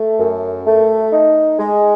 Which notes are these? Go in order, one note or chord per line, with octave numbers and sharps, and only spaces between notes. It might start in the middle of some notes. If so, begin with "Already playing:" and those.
Already playing: A3
F#2
A3
D#4
G#3